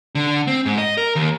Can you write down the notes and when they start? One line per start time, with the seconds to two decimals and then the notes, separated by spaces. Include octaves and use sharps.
0.15 D3
0.47 C4
0.66 G#2
0.78 D#5
0.97 A#4
1.16 D#2